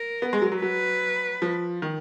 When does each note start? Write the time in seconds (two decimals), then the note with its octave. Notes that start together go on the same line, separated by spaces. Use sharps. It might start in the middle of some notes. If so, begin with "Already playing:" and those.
Already playing: A#4
0.22 B3
0.33 G#3
0.42 F#3
0.52 F#3
0.62 F#3 B4
1.42 F3
1.82 D#3